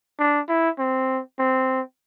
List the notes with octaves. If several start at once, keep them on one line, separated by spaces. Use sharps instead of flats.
D4
E4
C4
C4